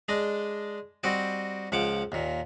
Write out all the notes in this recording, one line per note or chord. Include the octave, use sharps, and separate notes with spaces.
G#3 D4 D#5
G3 C4 F#4 D#5 G5
C#2 F3 F#5 G5 D6
D#2 A#2